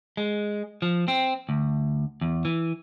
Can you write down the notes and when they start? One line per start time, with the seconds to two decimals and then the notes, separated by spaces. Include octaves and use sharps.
0.17 G#3
0.82 F3
1.08 C4
1.49 D2
2.21 E2
2.45 E3